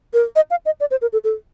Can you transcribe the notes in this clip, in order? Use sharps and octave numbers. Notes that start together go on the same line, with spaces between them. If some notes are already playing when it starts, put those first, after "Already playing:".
A#4
D#5
F5
D#5
D5
C5
A#4
A4
A4